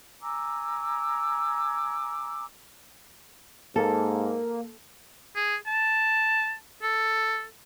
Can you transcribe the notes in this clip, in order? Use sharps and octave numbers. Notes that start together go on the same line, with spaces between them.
G#5 A#5 D6 E6
G#2 A#3 A4
G#4
A5
A4